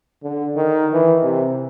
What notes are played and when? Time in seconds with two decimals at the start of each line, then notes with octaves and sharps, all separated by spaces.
0.23 D3
0.56 D#3
0.93 E3
1.23 C3